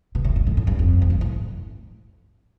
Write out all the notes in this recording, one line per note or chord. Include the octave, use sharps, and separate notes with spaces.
B2
A2
G2
A2
A2
G2
F2
A2
G2
A2